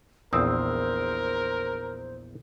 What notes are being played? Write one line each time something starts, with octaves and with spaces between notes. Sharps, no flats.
A#1 E2 C4 A#4 C5 D#6 E6 G6